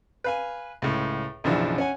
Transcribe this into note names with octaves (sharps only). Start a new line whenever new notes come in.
B4 F5 G#5
C#2 A2
B1 F#2 C#3 E3 F3 D4
C#4 F#5 G#5